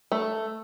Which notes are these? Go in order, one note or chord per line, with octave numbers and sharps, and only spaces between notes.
A3